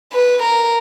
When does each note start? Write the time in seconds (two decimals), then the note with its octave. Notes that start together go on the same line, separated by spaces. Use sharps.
0.13 B4
0.43 A#4